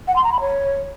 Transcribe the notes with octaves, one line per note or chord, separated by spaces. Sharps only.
F#5
C6
A#5
B5
C#5